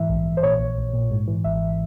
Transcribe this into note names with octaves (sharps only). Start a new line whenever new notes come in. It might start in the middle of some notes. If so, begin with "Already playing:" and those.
Already playing: G#2 E3 E5
A#1
A#1
C5
A#2 C#5
A#1
A#1
A#2
G#2
E3
G#1 E5